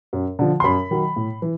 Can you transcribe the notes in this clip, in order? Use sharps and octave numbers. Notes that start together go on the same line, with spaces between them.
F#2
D3 F3
C6
F#2 B5
D#3 F#3
A2
E3